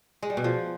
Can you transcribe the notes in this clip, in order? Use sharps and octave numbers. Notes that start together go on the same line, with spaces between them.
G#3
G3
B2
F3